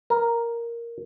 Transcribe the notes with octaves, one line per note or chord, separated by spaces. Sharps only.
A#4